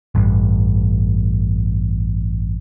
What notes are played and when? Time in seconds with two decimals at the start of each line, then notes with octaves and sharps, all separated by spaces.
0.15 A1 G2